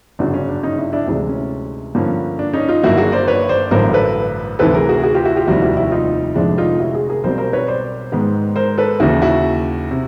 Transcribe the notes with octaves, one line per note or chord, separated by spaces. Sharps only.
G1 F#2 C#3 F#3 D4
C#4
D4
C#4 D#4
D4 E4
D4 E4
D2 C3 E3 G#3
C#4
G2 D3 F3 A#3 C#4
D4
C#4 D#4
D#4 F4
G1 G2 D#3 F#3 A#3 E4 F#4
F#4 G#4
C5 D5
B4 C#5
C5 D5
A1 G2 D3 F#3 A#4 C5
A4 B4
D2 C3 E3 A4 B4
G#4 A#4
F#4 G#4
F#4 G#4
F4 G4
E4 F#4
F4 G4
F1 D#2 D#3 G3 C4 E4 F#4
E4 F#4
E4 F#4
D#4 F4
F1 F2 D3 F3 G#3 D4 E4
D#4 F4
E4 F#4
F#4 G#4
G#4 A#4
B1 B2 G3 C4 A#4 C5
A#4 C5
B4 C#5
C5 D5
G#2 D#3 G#3 B3
A#4 C5
A4 B4
D#2 C#3 E3 E4 F#4
E4 F#4
C3